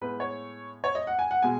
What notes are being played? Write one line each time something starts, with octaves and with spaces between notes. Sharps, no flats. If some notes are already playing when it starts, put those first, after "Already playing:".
A2 G#3 B3 B4
C#5
C#5
D#5
F#5
G#5
F#5
B2 G#3 G#5